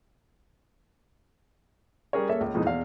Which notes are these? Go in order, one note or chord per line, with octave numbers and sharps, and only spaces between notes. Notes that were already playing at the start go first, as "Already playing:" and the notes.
G3 C#4 G#4 A#4 C#5
A#3 G#4 A4 C#5 E5
C#2
F2 B2 E3 G#3 B3 D#4
E2 B2 F5